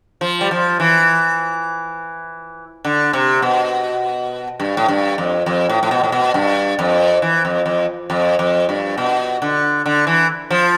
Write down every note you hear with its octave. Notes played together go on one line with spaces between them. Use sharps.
F3
G3
F3
E3
D3
C3
B2
G2
A2
G2
F2
F2
A2
A2
B2
A2
B2
G2
F2
E3
F2
F2
F2
F2
G2
B2
D3
D3
E3
F3